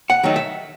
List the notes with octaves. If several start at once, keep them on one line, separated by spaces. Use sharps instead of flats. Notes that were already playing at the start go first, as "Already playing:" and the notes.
F#5
D#3 F#3 A3 D#4
E5